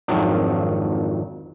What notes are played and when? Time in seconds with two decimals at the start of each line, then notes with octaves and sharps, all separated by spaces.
0.08 G#1 F2 D#3 F3 F#3 D4